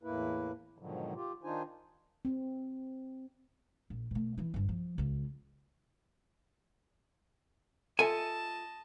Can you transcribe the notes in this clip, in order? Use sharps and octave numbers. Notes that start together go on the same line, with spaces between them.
E2 A2 A#3 E4 B4
G#2 B2 D3 D#3 F3 F#3
F4 G4
D#3 D4 D#4 F4 C5 G#5
C4
A#1
B2 A3
E3 E4
G1 G2
F3
C#2 F4
F4 A4 D#5 E5 G#5 A5